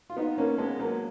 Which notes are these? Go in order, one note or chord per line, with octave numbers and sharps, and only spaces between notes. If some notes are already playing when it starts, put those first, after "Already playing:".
F4
B3 D#4
A#3 C#4
G#3 B3
F#3 A#3